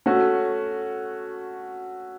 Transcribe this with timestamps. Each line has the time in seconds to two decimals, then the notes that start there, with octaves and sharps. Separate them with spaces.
0.06 A3 C#4 F#4